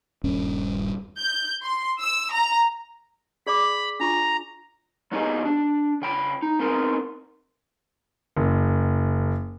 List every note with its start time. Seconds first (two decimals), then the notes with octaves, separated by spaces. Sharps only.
0.24 D#1 G2 C#4
1.20 G6
1.63 C6
2.00 E6
2.32 A#5
3.47 G#4 D5 B5 D6
4.00 D4 F4 A#5 C#6
5.12 F#3 B3 D#4 G4 G#4 D#5
5.45 D4
6.02 C#3 G5 B5
6.42 D#4
6.59 B3 C4 D#4 A#4
8.37 F#1